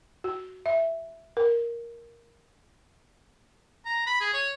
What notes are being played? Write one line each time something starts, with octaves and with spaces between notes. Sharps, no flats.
F#4
E5
A#4
A#5
B5
G#4
C#5